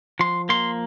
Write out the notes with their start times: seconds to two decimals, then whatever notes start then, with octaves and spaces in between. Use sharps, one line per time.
0.20 F3 C6
0.49 A#3 C6